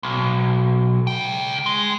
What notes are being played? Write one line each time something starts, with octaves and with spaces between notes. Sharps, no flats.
B1
C#2 G5
G#3